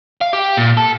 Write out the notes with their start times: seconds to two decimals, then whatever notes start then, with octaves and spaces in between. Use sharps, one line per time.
0.21 F5
0.33 G4
0.57 A#2
0.77 A4